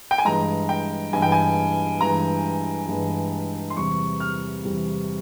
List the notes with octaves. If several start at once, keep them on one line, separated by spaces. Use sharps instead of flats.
G5
G#5
G2 E3 G#3 A#5
G5
G2 E3 G#3 G#5
G5
G#5
G2 E3 G#3 A#5
G2 E3 G#3
C6
E2 C3 G3 C#6
F6
E2 C3 G3